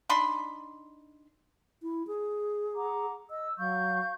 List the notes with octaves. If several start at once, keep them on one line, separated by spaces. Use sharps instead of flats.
D4 D#4 B5 C6
E4
G#4
F#5 A#5 D6
D#5 E6
F#3 F5 C#6 G6